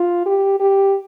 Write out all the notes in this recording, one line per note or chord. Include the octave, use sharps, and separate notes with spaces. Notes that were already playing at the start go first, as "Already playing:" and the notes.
Already playing: F4
G4
G4